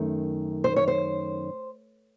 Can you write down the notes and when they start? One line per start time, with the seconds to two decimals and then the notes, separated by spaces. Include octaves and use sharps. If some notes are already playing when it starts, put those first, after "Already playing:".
Already playing: F#2 D#3 A3
0.64 C5
0.76 C#5
0.88 C5